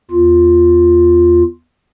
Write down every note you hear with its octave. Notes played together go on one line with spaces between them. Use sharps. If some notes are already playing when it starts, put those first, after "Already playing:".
E2 F4